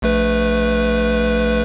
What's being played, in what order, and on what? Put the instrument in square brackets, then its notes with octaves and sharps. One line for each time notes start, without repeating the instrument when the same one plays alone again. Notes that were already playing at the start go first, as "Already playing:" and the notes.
[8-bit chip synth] A#1 A3 B4